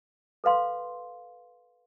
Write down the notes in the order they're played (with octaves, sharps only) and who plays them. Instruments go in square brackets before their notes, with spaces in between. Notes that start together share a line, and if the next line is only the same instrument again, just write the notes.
[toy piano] A4 B4 F5 C6